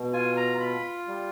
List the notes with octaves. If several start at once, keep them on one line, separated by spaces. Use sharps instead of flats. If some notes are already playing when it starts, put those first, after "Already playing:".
Already playing: B2
F4 G#5
A#5
F4 B5
G3